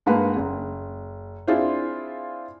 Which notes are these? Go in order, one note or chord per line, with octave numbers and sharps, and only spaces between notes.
G2 G#3 A#3 B4 F#5 B5
F#1
C4 D4 E4 F4 G#4 C5